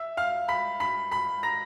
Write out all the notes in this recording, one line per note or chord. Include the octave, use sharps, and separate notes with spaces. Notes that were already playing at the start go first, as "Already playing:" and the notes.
Already playing: E5 E6
F5 F6
B5 B6
B5 B6
B5 B6
A#5 A#6